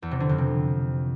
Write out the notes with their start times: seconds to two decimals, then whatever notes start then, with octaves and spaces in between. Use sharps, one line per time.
0.02 E2
0.11 C3
0.20 D3
0.29 F2
0.38 C3